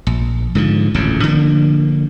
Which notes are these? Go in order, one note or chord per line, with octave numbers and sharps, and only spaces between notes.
A#1
G#2 D3 F3
D1 A1 F2 C#3
D3 F3 A3 A#3